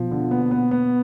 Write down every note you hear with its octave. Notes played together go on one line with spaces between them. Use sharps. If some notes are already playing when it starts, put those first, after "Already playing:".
Already playing: B2 F3
D3
B3
B3
B3